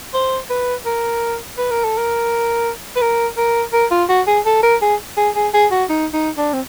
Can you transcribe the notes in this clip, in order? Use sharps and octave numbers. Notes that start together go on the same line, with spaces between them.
C5
B4
A#4
B4
A#4
A4
A#4
B4
A#4
A#4
A#4
F4
F#4
G#4
A4
A#4
G#4
G#4
G#4
G#4
F#4
D#4
D#4
D4
C4